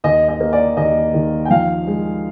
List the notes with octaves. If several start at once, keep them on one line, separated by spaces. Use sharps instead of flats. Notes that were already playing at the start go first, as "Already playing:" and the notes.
D#2 D#5
D#5
A#3
D5
D#2 D#5
D#3
G5
F3 F5
G#3